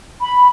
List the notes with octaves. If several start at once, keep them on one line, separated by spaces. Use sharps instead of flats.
B5